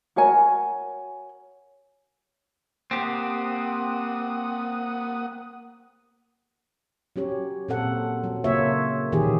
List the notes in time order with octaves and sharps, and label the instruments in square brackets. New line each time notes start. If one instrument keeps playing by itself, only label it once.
[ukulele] F#4 A#4 C#5 G#5
[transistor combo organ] A#3 F#5 D#6 [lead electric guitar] C4 G4
[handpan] F#3 C#4 G4 C#5
A#2 C4 A4 F#5
F#3
C#3 A#3 F4 C#5 E5
A#2 D#3 E3 G4 G#4